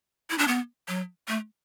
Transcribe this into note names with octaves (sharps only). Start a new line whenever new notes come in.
E4
D4
B3
F#3
A3